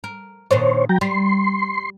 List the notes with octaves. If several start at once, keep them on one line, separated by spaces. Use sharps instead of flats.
A#4
A#2 D#3 D4 C5 C#5
F#3 G5 A#5
G3 C6